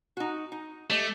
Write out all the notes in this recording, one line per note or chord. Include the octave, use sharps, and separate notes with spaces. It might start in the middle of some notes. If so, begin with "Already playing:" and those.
D#4 F#4
D#4
A3 G4 D#5